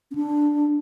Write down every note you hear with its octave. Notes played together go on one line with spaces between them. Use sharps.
C#4
D4